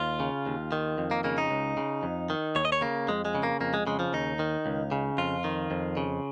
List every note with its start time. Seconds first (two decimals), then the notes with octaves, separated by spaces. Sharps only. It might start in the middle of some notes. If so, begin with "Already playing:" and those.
Already playing: D#2 F4
0.20 C#3
0.46 D#2
0.72 D#3
0.98 F2
1.11 A#3
1.24 C#3 A#3
1.38 D#4
1.51 C#2
1.77 C#3
2.03 F2
2.30 D#3
2.56 D#2 C#5
2.65 D#5
2.72 C#5
2.81 C#3 A#3
3.08 F2 G#3
3.25 G#3
3.35 C#3
3.43 A#3
3.60 F2 A#3
3.74 G#3
3.87 C#3 G#3
3.99 F3
4.13 D#2 D#4
4.39 D#3
4.66 C#2
4.92 C#3
5.18 F2 F4
5.44 D#3
5.71 F2
5.97 C#3